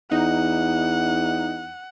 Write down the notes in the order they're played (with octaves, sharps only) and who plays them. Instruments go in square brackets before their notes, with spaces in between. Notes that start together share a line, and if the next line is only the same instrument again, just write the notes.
[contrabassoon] E2 [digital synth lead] D#4 [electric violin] F#5